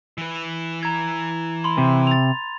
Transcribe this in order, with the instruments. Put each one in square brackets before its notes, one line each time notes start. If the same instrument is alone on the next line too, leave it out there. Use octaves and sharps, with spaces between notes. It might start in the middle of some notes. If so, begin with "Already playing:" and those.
[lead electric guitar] E3 B4
[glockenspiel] A#5 G#6
B5 C6
[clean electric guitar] C3
[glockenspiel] A6 F7